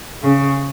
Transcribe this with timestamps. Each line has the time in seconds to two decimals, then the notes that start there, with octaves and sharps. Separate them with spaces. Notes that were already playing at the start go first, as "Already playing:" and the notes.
0.22 C#3